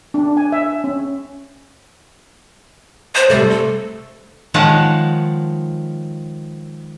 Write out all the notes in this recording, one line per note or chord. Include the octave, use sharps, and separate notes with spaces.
D4
G#5
E5
C#4
C5
C3 G3 A3
A4
D#3 F3 G#3 C#5 F#5 A5